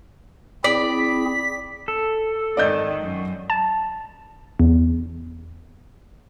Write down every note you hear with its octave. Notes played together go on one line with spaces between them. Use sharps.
C4 E4 G#4 D5 B6
A4
G#2 D#3 D5 D#5 G6
F#2
A5
E2